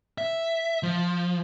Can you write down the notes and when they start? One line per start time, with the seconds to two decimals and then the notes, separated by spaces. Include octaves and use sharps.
0.18 E5
0.83 F3